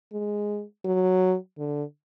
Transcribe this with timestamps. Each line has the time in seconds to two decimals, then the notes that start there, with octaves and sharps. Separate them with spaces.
0.12 G#3
0.85 F#3
1.58 D3